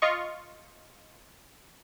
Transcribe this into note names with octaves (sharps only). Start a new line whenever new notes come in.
F4 D#5 C#6